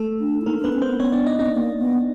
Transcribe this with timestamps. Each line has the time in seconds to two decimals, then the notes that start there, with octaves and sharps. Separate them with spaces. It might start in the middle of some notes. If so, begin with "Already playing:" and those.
Already playing: A3 A4
0.20 D4
0.41 E4
0.46 A#3 D#4 A#4
0.59 D4
0.64 B3 B4
0.72 C#4
0.82 C4 C5
0.87 B3
0.99 B3 C#4 C#5
1.12 D4 D5
1.26 D#4 D#5
1.38 C4 D#4 D#5
1.45 B3
1.53 A#3
1.80 B3